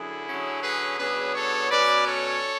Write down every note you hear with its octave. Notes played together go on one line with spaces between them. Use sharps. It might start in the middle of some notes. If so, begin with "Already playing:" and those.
Already playing: F#2 D3 E4 G#4
D3 F#3 C#4
G#4 B4
C#3 F#3 B3 D4 G#4 B4
A4 C#5
B2 F#3 C#4 B4 D5
A4 C#5